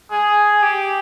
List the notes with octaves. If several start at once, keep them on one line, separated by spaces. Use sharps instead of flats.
G#4
G4